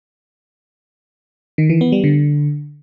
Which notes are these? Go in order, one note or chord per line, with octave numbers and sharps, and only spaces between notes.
D#3
E3
B3
G3
D3